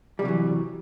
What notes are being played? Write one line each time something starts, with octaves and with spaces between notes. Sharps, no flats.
C3 E3 F#3 G3